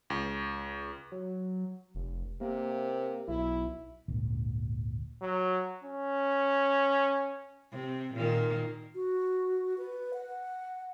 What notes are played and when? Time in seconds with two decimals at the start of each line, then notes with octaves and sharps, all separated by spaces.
0.10 C#2
1.12 F#3
1.95 F1
2.41 C3 A#3
3.28 B1 E4
4.08 G#1 D2 A#2
5.22 F#3
5.84 C#4
7.71 C3
8.15 A#2 D#3 A#3
8.95 F#4
9.78 B4
10.14 F#5